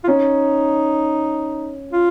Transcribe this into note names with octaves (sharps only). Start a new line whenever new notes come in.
F4
C#4 D#4
F4